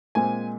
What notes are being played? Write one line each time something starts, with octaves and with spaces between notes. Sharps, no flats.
A#2 G#3 C4 G#5